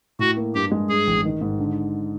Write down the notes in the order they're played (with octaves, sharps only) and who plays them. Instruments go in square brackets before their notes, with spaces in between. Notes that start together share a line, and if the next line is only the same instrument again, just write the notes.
[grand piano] A2 [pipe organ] F#4
[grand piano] A#3
[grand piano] G2 [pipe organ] G4
[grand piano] G#3
[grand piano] G2 [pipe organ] G#4
[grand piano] A1
D#3
G#2
D3